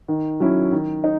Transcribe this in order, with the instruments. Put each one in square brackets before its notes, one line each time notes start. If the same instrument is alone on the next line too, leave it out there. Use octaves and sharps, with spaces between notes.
[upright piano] D#3
F#3 C#4 E4
D#3
D#4